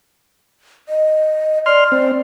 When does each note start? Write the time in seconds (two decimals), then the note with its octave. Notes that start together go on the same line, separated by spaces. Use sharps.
0.89 D#5
1.66 D5 C6 F6
1.92 C4